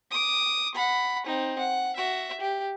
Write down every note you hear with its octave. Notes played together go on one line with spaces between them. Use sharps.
D6 D#6
F#5 B5
C4 D#4
F#5
F#4 E5
G4